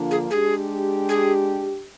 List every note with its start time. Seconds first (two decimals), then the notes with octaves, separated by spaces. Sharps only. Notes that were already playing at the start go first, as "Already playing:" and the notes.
Already playing: D3 F3 A#3 D4 F4
0.11 G#4
0.30 G#3 D4 G4 G#4
1.09 G#4